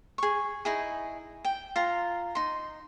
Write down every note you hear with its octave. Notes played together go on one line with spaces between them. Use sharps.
G#4 C#6
D#4 E4 G#4
G5
F4 A#5
D#4 C6